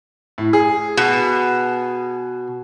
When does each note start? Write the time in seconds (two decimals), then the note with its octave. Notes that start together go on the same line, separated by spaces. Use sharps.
0.38 A2
0.53 G#4
0.97 B2